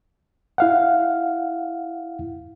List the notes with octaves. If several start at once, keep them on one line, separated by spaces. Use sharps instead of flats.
E4 F5 F#5